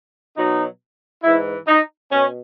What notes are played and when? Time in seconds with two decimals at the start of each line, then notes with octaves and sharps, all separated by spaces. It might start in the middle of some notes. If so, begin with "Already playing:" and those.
0.36 B2 F#3 D#4
1.24 G#2 E3 E4
1.67 D#4
2.11 B2 C#4